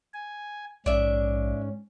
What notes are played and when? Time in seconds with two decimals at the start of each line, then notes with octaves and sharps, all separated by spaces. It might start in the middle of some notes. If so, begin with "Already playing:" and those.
0.14 G#5
0.86 A#1 G#2 C#4 D4 E5